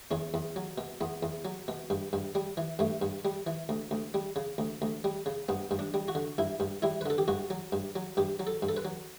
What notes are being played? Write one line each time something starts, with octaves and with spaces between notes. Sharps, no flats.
E2 C#4
E2
F#3
B2
E2 B3
E2
F#3
B2
G2
G2
G3
E3
G2 A3
G2
G3
E3
D2
D2
G3
C#3
D2
D2
G3
C#3
G2 B3
G2
D4
G3
F#4
D3
G2 E4
G2
G3 E4
B4
D3 A4
G4
G2 F#4
F#3
G2
F#3
G2 G4
F#3
A4
G2
A4
B4
F#3